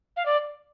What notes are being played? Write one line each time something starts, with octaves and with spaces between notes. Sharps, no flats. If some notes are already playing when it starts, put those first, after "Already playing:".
F5
D5